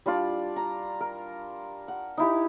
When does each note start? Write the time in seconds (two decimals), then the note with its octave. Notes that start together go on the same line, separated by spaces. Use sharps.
0.06 G3 D4 F4 D5
0.56 A#5
1.00 A#4
1.88 F#5
2.17 D#4 E4 G4